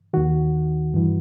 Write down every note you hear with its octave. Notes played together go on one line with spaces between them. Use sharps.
D#2 D#3 F#4
G2 E3